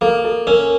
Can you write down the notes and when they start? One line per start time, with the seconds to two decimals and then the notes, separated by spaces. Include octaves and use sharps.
0.01 A#3 A4
0.24 A4
0.47 C#4 A#4